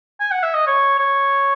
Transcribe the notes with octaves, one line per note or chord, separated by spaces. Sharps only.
G#5
F#5
E5
D#5
C#5
C#5